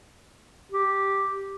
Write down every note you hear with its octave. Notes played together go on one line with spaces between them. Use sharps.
G4